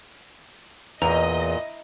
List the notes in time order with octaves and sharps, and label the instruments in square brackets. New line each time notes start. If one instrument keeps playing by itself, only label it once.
[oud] E2 [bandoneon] A#2 [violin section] D#5 [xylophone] A#5